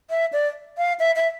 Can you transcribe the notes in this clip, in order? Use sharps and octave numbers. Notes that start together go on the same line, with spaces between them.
E5
D5
F5
E5
E5